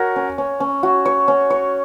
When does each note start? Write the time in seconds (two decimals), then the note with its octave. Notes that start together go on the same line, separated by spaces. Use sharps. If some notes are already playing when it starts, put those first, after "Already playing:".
Already playing: F#4 A#4 C#5
0.16 C#4
0.38 C#4
0.60 C#4
0.83 F#4
1.05 C#5
1.28 C#4
1.50 C#5